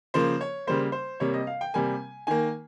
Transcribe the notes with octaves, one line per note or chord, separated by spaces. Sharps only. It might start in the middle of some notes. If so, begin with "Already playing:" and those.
C#3 F3 A#3 C5
C#5
C#3 G3 A#3 C5
C5
C3 G3 A#3 C#5
D#5
F5
G5
C3 G3 A#3 G#5
D#3 A#3 G#5